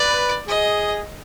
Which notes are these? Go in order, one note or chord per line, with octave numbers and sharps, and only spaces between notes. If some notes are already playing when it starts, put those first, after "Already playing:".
Already playing: B4 D5
G#4 D#5